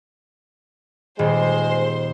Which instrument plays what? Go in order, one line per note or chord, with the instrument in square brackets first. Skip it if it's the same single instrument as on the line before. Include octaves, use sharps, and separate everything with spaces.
[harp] D#1 [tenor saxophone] G#3 [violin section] C5 C6